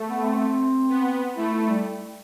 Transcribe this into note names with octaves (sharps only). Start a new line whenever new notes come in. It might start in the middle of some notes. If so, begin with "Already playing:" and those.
Already playing: A3
B3
C4
B3
A3 E4
E4
G3